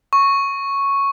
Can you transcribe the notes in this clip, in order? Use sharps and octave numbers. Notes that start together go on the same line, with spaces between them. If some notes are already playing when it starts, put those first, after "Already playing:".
C#6